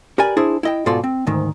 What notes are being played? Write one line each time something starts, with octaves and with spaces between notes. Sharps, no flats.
G4 A#4 B4 D5 G#5
D4 E4 G#4 C5
E4 D#5 G5
G#2 B2 F4 A4 D5 C6
C4
D2 G#2 D#3